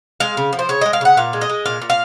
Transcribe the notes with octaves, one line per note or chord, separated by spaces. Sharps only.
G#3 F5
C#3
F3
C5
C#3 C#5
G#3 D#5
F5
C#3 F#5
A#2 F5
G#3
D#5
G#3
A#2 F5
A#2
F5